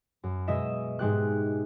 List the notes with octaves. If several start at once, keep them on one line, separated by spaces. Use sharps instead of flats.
F#2
B2 G#3 D#5 E5 E7
G#2 G#3 G4 F#6